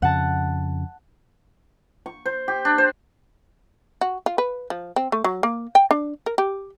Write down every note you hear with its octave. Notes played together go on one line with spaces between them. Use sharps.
F2 C#3 F#5 A5
C#6
C5
G4
D4
C5
F#4
F4
B4
F3
C4
A3
F#3
A#3
G5
D4
A#4
G4